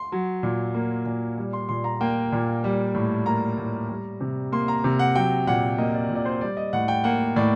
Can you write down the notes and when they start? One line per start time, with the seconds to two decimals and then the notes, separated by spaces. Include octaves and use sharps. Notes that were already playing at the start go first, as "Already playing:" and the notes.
Already playing: C6
0.12 F#3
0.43 A#2
0.74 A#3
1.06 A#2
1.38 G3
1.53 C6
1.69 A#2 C6
1.84 A#5
2.01 A#3 G5
2.32 A#2
2.64 G3
2.95 A2
3.26 A#3 A#5
3.58 A2
3.89 G3
4.21 C3
4.52 A#3 C6
4.68 A#5
4.84 C3
4.99 F#5
5.15 F#3 G5
5.47 A#2 F#5
5.78 A#3 D#5
5.94 D5
6.09 A#2
6.15 D5
6.25 C5
6.41 G3 D5
6.57 D#5
6.73 A2 F#5
6.88 G5
7.04 A#3 F#5
7.36 A2 D5